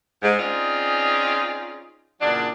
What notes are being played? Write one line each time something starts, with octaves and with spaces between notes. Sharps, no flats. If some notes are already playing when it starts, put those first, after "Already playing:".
G#2
C4 C#4 D#4 F4 G#4 D5
E2 A#2 C#3 F#3 D4